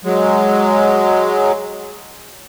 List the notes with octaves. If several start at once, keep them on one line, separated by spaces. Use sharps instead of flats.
F#3 G#3